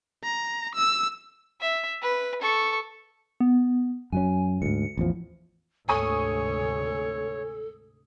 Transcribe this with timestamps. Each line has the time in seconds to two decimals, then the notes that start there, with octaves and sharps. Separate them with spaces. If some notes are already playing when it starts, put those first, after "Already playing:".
0.24 A#5
0.76 E6
1.61 E5
2.02 B4
2.42 A4 C#6
3.40 B3
4.12 F#2 F#3 C#4 G#5
4.62 D2 G#2 C#7
4.97 A1 E2 F3
5.89 D2 G#2 C3 A4 C#5 G#5 C#6 D#6